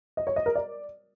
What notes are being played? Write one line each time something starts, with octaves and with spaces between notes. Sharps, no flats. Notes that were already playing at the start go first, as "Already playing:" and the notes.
D#5
C#5
D#5
A#4
D5